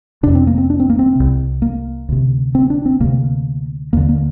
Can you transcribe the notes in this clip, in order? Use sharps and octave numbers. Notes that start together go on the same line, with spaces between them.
F2 C3 D4
C4
A#3
C4
D4
C4
A#3
C4
C2 C3
A#3
D2 C3
C4
D4
C4
D2 C3 A#3
D#2 D3 A#3
A#3